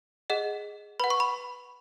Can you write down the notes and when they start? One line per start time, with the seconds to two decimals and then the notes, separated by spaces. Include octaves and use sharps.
0.30 G#4 D#5 F#5
1.00 B4 F#5 B5
1.10 C#6
1.20 B5